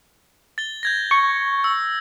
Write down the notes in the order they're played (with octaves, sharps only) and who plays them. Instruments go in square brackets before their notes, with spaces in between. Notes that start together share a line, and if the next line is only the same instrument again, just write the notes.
[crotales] A6 G7
G6 G#6 A#6
[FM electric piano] C#6
[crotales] E6